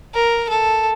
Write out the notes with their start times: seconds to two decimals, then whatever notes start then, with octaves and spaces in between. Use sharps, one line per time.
0.14 A#4
0.49 A4